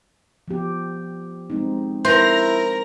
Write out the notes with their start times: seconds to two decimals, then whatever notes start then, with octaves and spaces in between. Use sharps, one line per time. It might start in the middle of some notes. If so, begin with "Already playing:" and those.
0.48 F3 B3 G4
1.50 G#3 C4 D#4
2.05 E4 A#4 C5 A#5